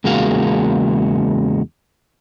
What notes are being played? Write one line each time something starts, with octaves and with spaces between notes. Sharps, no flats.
E2 C#3 G#3 A#3 F#4 F5